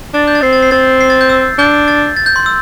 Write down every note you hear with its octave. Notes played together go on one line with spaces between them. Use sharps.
D4 A6
G6
A6
C4 C7
A6
C7
C4 A6
C7
A6
G6
E6
D4 G6
A6
A6
G6
C6
E6